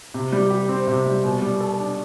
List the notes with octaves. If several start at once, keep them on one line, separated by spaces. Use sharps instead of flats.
C3
G3
G4
C4
C3
G3
B2
G3
A4
D4